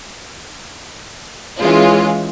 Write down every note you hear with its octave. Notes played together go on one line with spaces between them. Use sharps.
E3 G#3 C#4 F4